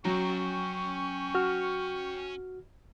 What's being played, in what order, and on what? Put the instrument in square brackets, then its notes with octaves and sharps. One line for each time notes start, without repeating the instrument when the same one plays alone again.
[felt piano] F#3 [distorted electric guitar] C#4 A#5 [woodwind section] G5 C#6
[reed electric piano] F#4 F6